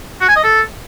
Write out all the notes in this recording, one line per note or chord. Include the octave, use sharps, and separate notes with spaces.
F#4
G#5
D#5
A4